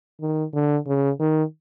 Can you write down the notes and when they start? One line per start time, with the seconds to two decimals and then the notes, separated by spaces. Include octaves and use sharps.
0.21 D#3
0.54 D3
0.87 C#3
1.20 D#3